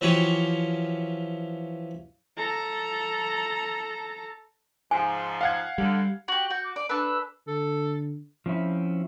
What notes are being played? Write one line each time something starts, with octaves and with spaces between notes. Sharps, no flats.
E3 F3 C#4 F#4 G4 C#5
A4 A#5
G#2 F3 G#5
F5 F#5 G#6
D3 G3
F#4 G4 F#7
F#4 G6
D6
D5 D6
D4 A4 B4 E6
D3 A4
F3 C4 C#4 E4